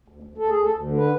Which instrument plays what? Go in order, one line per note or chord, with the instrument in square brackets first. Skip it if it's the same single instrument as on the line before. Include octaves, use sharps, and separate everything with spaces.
[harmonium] D2
D2
D2 A4
D2 G#4
A4
D2
D3
B4